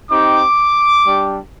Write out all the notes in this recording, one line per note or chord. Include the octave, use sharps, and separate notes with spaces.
C4 D#4 G4 D6
G3 D4 G4